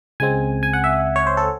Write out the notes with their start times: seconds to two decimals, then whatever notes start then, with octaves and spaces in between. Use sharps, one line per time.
0.20 C#2 C#3 G#3 C4 G#5
0.63 G#5
0.73 F#5
0.84 E5
1.16 C#5
1.27 C5
1.37 A4